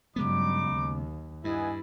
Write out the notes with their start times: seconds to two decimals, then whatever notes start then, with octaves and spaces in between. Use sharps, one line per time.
0.16 G2 C#3 F#3 G#3 B3 D#4 B5 D6
0.69 D#2
1.44 G2 B3 E4 D#5 G#5